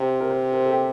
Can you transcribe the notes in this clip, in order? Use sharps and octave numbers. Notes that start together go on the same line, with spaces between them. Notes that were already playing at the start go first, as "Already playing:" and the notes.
Already playing: C3
A#4
C5
A#4
A4
G4